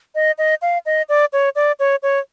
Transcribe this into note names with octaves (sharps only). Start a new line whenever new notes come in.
D#5
D#5
F5
D#5
D5
C#5
D5
C#5
C#5